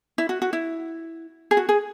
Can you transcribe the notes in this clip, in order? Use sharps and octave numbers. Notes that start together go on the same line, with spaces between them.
E4
F#4
F#4
E4
G#4
F#4
G#4